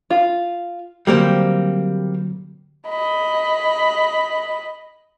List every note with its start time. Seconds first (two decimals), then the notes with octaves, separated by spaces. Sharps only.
0.10 F4
1.07 D3 F#3 G3 A#3 C4
2.88 D#5 B5